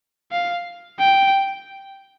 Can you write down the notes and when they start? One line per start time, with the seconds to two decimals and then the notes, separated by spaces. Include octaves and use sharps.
0.32 F5
0.99 G5